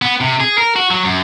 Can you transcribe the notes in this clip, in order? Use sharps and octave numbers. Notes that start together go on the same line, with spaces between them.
B3
C3
G#4
A#4
F#4
F#3
F#2